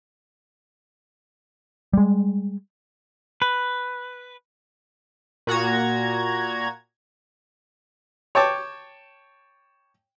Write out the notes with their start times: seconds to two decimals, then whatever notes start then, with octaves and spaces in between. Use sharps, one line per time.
1.93 G3 G#3
3.42 B4
5.47 A#2 F#4 A#5 G#6
8.35 C#5 G5 A5 D6